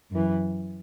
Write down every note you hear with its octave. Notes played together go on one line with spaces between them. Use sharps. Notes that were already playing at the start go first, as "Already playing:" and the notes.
F#2 E3